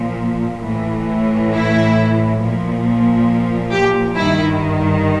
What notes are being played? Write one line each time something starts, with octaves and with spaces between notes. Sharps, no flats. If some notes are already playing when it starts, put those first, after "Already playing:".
Already playing: A#2 F3
A2 E3
E4
A#2 F3
G4
G2 D#3 E4